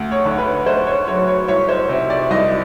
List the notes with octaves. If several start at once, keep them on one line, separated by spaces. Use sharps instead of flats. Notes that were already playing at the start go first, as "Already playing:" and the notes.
Already playing: D2
C#5
D3
B4
A3 C5
C#5
F#3 C#5
C#5
C2 C#5
C5
C3
D5
C2 D#5